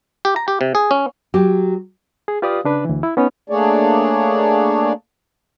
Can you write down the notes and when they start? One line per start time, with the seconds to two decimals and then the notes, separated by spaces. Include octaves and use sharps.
0.25 G4
0.36 A#5
0.48 G4
0.61 C3
0.75 G#4
0.91 C#4
1.34 F#3 G4
2.28 G#4
2.42 F4 G4 B4 D5 F5 D#6
2.65 C#3 D4 B4
2.85 D2 E3
3.03 E4
3.17 B3 C#4 D#4 B4 C#5
3.50 A3 A#3 D4 G#4 C#5 D5